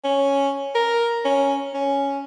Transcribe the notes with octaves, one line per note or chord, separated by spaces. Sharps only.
C#4
A#4
C#4
C#4